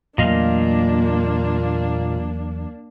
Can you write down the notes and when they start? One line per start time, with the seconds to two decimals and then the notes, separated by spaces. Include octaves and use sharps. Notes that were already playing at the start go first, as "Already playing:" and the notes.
0.18 E2 A#2 F#3 A3 A#3 D4 D#5 F5